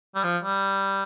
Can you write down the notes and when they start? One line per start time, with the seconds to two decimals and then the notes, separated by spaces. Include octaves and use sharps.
0.15 G3
0.24 F3
0.44 G3